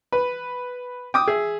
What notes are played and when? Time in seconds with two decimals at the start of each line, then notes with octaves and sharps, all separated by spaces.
0.12 B4
1.14 G5 D6 D#6
1.28 G#4 E5